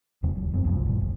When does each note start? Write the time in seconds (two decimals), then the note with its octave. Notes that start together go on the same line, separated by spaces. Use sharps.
0.23 D#1 E2 C#3 F#3
0.35 D#1 F#3
0.52 E1 F#2 C4
0.64 F#1 C2 F2
0.86 G#1 F#2 A#2 G3
1.00 F1